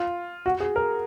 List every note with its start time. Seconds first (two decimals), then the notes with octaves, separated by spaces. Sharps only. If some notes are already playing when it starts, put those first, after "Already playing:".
Already playing: F4
0.46 F#4
0.60 G#4
0.76 A#4